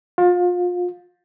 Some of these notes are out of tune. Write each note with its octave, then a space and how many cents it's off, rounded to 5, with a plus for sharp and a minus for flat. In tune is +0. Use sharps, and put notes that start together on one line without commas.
F4 +30